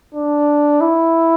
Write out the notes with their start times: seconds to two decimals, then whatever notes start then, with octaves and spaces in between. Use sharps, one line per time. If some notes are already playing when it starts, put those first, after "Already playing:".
0.14 D4
0.81 E4